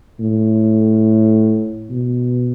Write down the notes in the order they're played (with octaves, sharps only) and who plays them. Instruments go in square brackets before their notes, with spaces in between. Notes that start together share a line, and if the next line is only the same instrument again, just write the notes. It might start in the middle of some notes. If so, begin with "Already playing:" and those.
[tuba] A2
B2